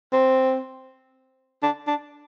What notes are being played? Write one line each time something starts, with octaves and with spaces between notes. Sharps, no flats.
C4
D4
D4